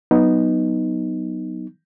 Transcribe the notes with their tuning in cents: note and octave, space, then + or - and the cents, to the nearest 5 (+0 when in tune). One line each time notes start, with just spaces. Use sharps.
F#3 +0 B3 -5 D#4 +0